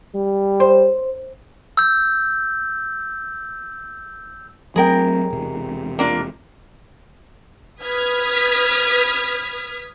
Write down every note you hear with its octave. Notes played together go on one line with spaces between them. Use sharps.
G3
C5
E6 G6
F#3 A3 C4 G#4 A#4 G5
E1 C3
A#3 D4 F4
B4 D#6 F6 G#6 B6